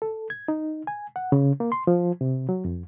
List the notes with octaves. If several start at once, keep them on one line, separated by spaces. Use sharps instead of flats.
A4
G#6
D#4
G#5
F#5
C#3
A#3
C6
F3
C3
F#3
F2